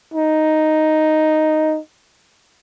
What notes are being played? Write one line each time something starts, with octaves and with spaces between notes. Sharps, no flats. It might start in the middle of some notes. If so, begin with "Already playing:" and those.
D#4